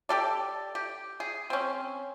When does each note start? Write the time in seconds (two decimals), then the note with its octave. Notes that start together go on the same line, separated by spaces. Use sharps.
0.09 G4 A4 D5
0.75 G4
1.20 G#4
1.50 C4 C#4